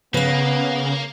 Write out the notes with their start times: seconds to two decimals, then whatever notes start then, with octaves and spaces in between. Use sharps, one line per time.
0.14 C#3 A#3 B3 B4 F5